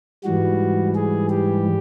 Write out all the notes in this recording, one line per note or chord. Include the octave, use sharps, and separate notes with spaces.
G#2 E3 G3 F#4
G#4
G4